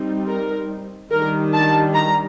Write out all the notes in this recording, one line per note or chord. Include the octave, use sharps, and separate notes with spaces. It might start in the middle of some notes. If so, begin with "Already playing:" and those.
Already playing: G3 C4 D#4
A#4
D#3 G3 D4 A#4
A5
A#5